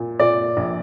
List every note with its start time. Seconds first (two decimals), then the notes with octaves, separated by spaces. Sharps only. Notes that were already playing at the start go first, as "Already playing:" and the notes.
Already playing: A#2
0.19 A#2 D5
0.57 A#1